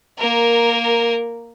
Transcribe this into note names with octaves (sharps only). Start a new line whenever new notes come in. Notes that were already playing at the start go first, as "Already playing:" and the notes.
A#3 A#4